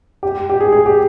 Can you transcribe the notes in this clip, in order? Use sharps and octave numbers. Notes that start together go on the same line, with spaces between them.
G4
G4
G#4
G#4
G4